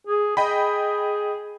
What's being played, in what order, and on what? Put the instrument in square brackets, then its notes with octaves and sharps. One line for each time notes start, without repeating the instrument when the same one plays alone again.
[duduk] G#4
[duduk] G#4 [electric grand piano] D#5 G5 B5